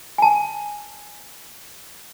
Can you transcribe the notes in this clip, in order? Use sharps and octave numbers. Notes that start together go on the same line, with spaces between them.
G#5 A5